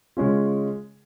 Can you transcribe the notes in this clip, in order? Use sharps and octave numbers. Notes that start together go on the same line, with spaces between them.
C#3 G#3 C#4 F4